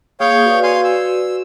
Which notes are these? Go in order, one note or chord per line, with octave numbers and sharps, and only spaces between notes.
A#3 G#4 C#5 F5 G5 D#6
F#4 B4 D5
F5 G#5 C6
E6